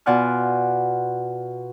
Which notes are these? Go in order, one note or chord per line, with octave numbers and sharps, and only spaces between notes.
B2 F4 D5 F#5 G#5 F6